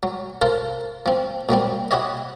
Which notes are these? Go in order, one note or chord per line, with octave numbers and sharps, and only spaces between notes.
F#3
F4 A4 A#4 C5
F3 C4
A#2 F#3 G3 C4
E4 F#4 G4 C#5 D#5